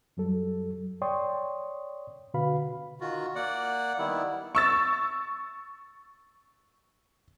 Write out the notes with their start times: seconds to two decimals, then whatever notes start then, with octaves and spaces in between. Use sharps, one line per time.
0.17 F#2 F#3 G3 A4
1.02 C#5 D5 G5 C6 C#6 D#6
2.34 B2 D3 F#4 B4 F5 B5
3.01 D#3 F4 F#4
3.35 A#3 D5 F#5
3.99 D#3 G3 B3 E4
4.55 C#6 E6 A6